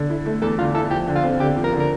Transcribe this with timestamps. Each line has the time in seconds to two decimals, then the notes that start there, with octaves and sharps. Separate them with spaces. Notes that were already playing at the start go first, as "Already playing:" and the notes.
Already playing: D3
0.10 E4
0.26 A3
0.42 E2 A4
0.58 D3 F4
0.75 E4 A4
0.91 F3 G4
1.07 D3
1.15 F4
1.24 C4
1.40 D3 G4
1.56 F3
1.64 A#4
1.73 D3
1.80 A#4